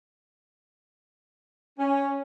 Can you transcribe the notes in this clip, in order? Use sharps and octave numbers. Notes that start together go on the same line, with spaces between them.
C#4